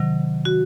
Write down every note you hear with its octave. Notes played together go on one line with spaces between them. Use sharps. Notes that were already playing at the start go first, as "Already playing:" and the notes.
Already playing: C3 D#3 F#3
F#4